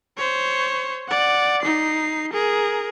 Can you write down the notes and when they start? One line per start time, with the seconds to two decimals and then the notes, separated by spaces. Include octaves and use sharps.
0.17 C5 C#5
1.08 D5 F#5
1.62 D#4 C7
2.33 G#4 A#4